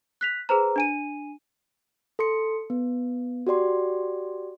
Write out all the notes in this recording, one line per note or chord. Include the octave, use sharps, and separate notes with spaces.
F#6 B6 F7
G#4 B4 C5 A#5
D4 G#5 D#7
A4 C6 C#7
B3
F#4 G4 D5 C6